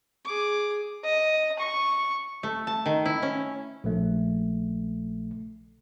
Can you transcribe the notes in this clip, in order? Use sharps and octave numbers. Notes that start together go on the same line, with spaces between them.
G#4 D6
D#5
C#6
A3
A5
D#3
E4
C#4
A#1 A3